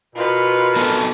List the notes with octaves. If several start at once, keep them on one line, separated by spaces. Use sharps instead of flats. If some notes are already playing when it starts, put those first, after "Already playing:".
B2 F4 A#4 B4
F#3 B3 A4